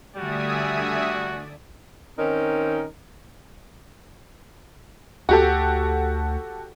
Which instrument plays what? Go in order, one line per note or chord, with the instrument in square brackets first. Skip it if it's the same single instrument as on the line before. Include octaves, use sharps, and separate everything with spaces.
[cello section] D3 A3 D5 [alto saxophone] G3 [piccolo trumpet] F#4 [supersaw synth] E5 G#5 D#6
[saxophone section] D#3 C4 C#4 D#4 A#4
[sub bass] D2 [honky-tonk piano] F#4 G4 A4